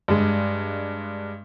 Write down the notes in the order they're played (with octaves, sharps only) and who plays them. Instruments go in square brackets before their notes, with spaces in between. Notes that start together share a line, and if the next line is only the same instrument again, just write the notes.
[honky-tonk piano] G2 G#3